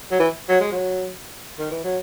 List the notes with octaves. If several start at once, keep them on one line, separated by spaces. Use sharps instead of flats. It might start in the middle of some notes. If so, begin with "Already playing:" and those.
F#3
E3
F#3
G#3
F#3
D#3
E3
F#3